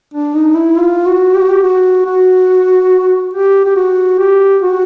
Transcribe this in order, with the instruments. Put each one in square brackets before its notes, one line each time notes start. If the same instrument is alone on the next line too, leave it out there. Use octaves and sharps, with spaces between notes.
[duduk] D4
D#4
E4
F4
F#4
G4
F#4
G4
F#4
F#4
G4
G4
F#4
G4
F#4